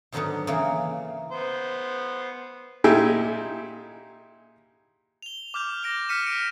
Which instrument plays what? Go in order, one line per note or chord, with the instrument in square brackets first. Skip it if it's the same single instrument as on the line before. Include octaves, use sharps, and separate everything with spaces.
[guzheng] G#2 D3 D#3 F#3 B3 D4
C#3 E3 A#3
[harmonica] B3 C5
[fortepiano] A#2 D#4 E4 G4 G#4
[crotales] F7 G7
D6 F6 G6 F7
A#6 D7 G7
F6 B6 C#7 D#7 E7
D7